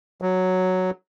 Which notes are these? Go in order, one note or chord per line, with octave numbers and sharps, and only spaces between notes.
F#3